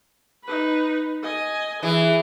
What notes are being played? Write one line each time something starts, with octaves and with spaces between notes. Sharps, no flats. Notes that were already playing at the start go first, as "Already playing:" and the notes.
D#4 B4
D#5 G#5
E3 G#4